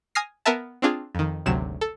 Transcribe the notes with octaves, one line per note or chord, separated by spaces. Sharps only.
G#5 D#6 F6 A#6 C7
B3 A#4 B4 E5 A5
C4 D4 F4 G#4
F2 D#3
G#1 D2 C3 F#3 E7
A4